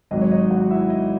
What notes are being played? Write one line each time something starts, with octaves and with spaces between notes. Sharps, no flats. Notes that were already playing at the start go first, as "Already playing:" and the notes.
G#1 G#2 F#3 D#4 D#5
C#5
D#4 D#5
F#4 F#5
E4 E5
D#4 D#5